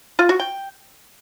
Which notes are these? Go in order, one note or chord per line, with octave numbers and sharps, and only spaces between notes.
F4
F#4
G5